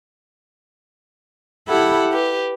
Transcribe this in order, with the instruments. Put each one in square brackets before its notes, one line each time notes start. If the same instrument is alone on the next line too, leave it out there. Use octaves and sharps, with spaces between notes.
[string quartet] E4 G4 A4 F#5 B5
G4 B4